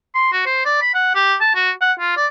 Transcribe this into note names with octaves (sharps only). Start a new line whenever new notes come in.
C6
F#4
C5
D5
B5
F#5
G4
A5
F#4
F#5
F4
D5